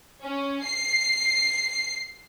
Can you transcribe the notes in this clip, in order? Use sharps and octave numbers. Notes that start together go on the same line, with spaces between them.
C#4
C7